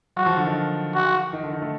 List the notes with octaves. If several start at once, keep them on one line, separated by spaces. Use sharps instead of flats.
F#3 F#4
F3
D3
D#3
F#4
D#3
D3
D#3
A3